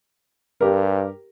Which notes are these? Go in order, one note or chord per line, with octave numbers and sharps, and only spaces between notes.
G2 G4 A#4